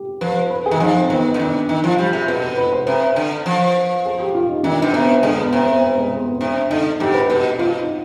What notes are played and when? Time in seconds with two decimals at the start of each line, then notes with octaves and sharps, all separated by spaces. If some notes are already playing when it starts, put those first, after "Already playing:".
Already playing: G4
0.21 F3 B4
0.50 B4
0.66 G#4
0.71 D#3
0.80 F3 D#4
0.96 C4
1.10 D#3 B3
1.34 D3
1.39 D#3 D4
1.69 D#3 D#4
1.84 F3 F4
1.98 G3 G4
2.13 C3 G#4
2.27 B2 B4
2.42 B4
2.57 B4
2.73 C5
2.86 C3 B4
3.16 D3
3.46 F3
4.06 G#4
4.20 G4
4.35 F4
4.49 D#4
4.63 D#3 D4
4.82 B2
4.93 C3 B3
5.22 D3 G#3
5.38 B3
5.53 C3 C4
5.67 B3
5.82 B3
5.97 G#3
6.11 B3
6.26 C4
6.41 C3 D4
6.70 D3 D#4
7.00 G#2 G4
7.14 B4
7.30 B2 B4
7.59 B2 F4
7.79 D#4